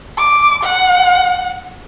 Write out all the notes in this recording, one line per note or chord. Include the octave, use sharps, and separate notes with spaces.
D6
F#5